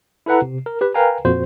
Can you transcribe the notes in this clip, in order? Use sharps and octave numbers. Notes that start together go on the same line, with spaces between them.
E4 A4 B4 F#5 A#5
C3
A#4
G4 B4
A#4 B4 F5 G5 G#5 A#5
F2 A#2 F#4 C5